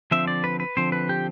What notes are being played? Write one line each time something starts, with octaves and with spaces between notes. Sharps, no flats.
D3 F3 C4 E5
D5
B4
B4
D3 F3 C4 C5
B4
G4